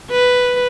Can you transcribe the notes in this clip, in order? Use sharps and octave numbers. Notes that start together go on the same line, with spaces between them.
B4